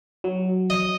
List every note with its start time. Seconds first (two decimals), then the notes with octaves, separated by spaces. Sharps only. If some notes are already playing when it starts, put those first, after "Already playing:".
0.24 F#3
0.70 D#5